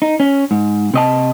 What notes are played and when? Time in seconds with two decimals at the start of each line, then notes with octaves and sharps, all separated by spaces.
0.02 D#4
0.20 C#4
0.51 G#2
0.94 C3 D#5 A5